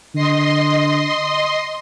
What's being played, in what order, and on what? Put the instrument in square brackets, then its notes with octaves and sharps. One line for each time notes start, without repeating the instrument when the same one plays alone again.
[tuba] D3 [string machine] D#5 C6